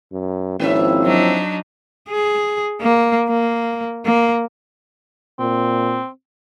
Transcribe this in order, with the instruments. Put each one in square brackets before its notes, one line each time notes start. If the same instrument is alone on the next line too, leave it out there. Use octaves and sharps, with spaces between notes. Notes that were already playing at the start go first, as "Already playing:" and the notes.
[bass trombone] F#2
[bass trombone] G#1 [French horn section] F3 C4 E4 [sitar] A#3 C#4 E5
[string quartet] F#3 D4 D#4
[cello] G#4
A#3
A#3
A#3
[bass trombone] A#2 [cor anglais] C4